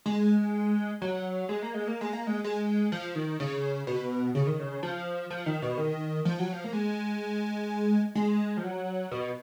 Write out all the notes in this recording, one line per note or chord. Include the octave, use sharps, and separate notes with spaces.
G#3
F#3
G#3
A#3
G#3
A#3
G#3
A#3
G#3
G#3
F3
D#3
C#3
B2
C#3
D#3
C#3
F3
F3
D#3
B2
D#3
F3
F#3
F3
A#3
G#3
G#3
F3
F#3
B2